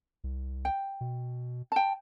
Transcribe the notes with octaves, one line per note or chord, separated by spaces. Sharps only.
C2
G5
B2
G5 A5